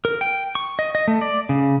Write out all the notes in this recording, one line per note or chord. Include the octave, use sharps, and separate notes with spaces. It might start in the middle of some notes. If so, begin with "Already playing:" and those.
A#4
G5
C#6
D#5
D#5
A3
D5
C#3